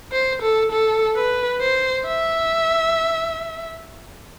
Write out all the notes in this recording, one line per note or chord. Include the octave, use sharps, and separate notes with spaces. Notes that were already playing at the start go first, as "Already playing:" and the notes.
C5
A4
A4
B4
C5
E5